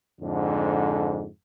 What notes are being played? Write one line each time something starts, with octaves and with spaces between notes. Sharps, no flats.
F2 G#2 D3